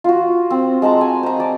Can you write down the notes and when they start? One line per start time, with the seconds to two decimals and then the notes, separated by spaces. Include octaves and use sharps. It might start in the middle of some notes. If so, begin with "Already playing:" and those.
0.04 F4 F#4
0.50 C4
0.82 G#3 F#5 A5 A#5
1.01 G#5
1.23 C5 A#5
1.40 D5 A5